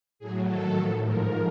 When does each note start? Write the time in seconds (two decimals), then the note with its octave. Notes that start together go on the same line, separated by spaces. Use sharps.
0.19 A2 F#3 G#4
0.47 G#2 D#3 F#3 A4
0.75 A2 F3
1.04 G#2 F3 A#4